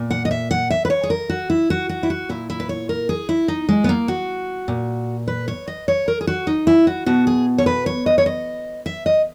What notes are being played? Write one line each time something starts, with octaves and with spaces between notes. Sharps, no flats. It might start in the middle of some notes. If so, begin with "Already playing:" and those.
Already playing: A#2
F#5
D#5
E5
F#5
E5
B4
C#5
G#4
A#4
F#4
E4
F#4
F#4
E4
F#4
A#2 E4
E4
B4
C#5
A#4
G#4
E4
D#4
G#3
B3
A#3
F#4
A#2
B4
C#5
D#5
C#5
A#4
G#4
F#4
D#4
E4
F#4
B2 F#4
G#4
C#5
B4
C#5
D#5
C#5
D#5
E5
D#5